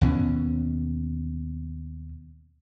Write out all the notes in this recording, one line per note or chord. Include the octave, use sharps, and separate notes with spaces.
D#2 B2 E3 C#4